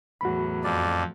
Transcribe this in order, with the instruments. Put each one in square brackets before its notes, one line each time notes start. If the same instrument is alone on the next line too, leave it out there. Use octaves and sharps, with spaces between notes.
[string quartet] E2 A2 F#3 [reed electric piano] F#4 B5
[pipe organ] F2 [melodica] D5